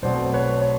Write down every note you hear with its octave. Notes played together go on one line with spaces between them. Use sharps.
B1 B2 F#3 A3 C4 C5 D5
B4 C#5
C#5